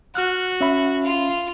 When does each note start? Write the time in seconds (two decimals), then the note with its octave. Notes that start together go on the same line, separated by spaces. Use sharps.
0.15 F#4 F6 F#6
0.61 C#4 E5 B5
1.03 F4 F5